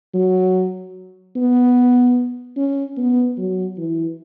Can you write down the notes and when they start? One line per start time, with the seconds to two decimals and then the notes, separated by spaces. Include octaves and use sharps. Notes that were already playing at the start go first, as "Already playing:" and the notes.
0.14 F#3
1.36 B3
2.56 C#4
2.97 B3
3.38 F#3
3.78 E3